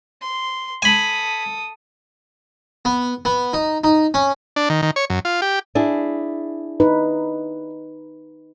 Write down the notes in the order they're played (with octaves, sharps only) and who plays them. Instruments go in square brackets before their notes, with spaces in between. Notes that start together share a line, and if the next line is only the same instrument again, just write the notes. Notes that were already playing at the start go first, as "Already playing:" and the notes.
[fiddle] C6
[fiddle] A4 D#6 [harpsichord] G#5 B5
[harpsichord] B3
B3
D#4
D#4
C#4
[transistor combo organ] D4
D#3
D#3
C#5
F#2
F4
G4
[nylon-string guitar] D4 E4 G#4
[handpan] D#4 B4